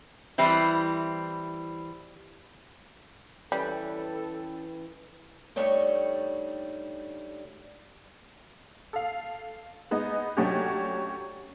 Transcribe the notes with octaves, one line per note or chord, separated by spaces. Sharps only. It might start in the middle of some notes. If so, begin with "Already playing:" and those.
E3 G3 C4 E4
E3 G3 C#4 A4 B4 G5
G2 G3 A3 D#4 C#5 G5
A4 F5
G#3 B3 D#4
F#3 A3 C#4 D4 F#4 G4